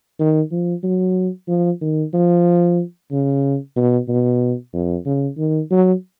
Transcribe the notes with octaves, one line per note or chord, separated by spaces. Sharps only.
D#3
F3
F#3
F3
D#3
F3
C#3
B2
B2
F2
C#3
D#3
F#3